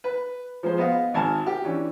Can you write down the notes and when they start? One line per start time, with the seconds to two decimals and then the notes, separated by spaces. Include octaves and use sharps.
0.04 B4
0.63 F3 G#3 C5
0.78 B3 D#5 F5
1.14 G#1 G#5 A5 F6
1.46 G4
1.64 E3 C#4 D4